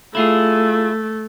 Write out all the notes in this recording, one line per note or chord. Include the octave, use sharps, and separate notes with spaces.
A3 E4 F4 G#4